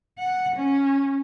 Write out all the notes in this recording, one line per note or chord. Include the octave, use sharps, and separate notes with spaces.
F#5
C#4